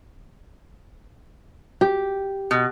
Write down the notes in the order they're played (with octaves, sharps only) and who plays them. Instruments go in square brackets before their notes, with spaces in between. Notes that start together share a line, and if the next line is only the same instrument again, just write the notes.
[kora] G4
[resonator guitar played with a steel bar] B2